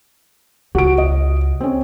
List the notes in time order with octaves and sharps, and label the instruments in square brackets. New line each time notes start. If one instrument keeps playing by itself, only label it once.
[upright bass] C#2 [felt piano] F#4 D7
[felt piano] D#5
C4 C#4